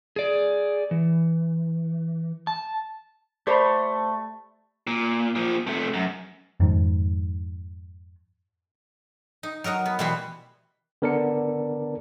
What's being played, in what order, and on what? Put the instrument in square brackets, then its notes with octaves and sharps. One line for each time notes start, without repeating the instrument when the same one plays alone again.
[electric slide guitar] G#4 D5
E3
A5
[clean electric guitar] A3 [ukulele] G4 C5 [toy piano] D5 B5
[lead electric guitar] A#2
A#2 F3
C3 A3
F#2
[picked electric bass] F2 G#2 D#3
[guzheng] D#4
F#3 A#4 D#5 F#5
B3
B2 E3 G3 F#4 C5 B5
[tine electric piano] D3 B3 A#4 D5 A5 C#7